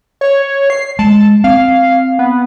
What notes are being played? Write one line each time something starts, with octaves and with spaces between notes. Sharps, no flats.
C#5
C7
G#3 A5
C4 F5
B3